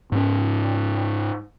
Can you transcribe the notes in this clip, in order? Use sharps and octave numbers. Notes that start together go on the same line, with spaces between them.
G#2 C#4